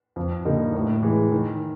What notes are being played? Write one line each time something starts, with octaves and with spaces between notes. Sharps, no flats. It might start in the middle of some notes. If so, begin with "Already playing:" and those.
F2
D3 G3 A#3 D#4
A2
E3 G#3
D#3